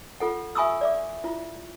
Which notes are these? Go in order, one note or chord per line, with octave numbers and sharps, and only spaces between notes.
F4 A4 F#5
E5 G#5 B5 C#6 D#6 E6
D5 E5 D6
E4 F4